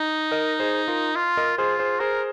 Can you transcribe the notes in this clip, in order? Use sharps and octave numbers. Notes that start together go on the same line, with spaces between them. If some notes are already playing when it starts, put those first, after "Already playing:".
Already playing: D#4
A#4 D#5
G#4 C5
F4 A#4
F4
A#4 D#5
F4 G#4 C5
G#4 C5
G#4 A#4 C5